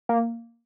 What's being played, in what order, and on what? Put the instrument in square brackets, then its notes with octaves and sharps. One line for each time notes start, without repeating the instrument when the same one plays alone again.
[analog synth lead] A#3